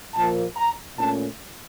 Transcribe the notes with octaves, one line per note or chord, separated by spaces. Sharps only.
A#2 F3 A#3 A5
A#5
A#2 A3 C#4 A5